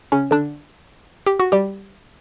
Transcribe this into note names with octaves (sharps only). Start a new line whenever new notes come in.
C#3 C#4
D3 D4
G4
F#4
G3 G4